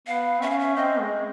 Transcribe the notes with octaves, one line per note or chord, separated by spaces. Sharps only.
B3 F5
C#4 E5
F5
E5
C4 D#5
G#3